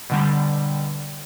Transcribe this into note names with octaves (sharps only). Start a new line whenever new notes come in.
B2 D3 G3